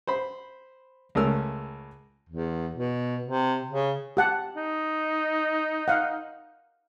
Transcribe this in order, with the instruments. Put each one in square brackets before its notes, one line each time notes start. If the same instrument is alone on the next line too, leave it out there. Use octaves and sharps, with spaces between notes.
[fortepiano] C5 B5
C#2 A3 C#4 A#4 E6 F6
[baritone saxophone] E2
B2
C3
C#3
[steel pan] G4 F#5 A5
[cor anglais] D#4
[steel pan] F5 F#5